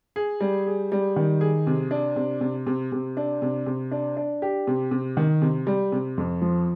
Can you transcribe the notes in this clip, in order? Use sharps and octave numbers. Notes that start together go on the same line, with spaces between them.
G#4
G3
G#4
G3
D#3
G#4
C3
D4
C3
C3
C3
C3
D4
C3
C3
D4
D4
G4
C3
C3
D#3
C3
G3
C3
F2
F3